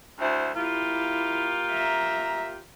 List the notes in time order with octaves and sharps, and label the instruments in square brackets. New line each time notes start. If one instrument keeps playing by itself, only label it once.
[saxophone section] D2 E4 C5
[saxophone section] A#3 F4 G4 [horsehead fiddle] E4
[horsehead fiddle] E5 A#5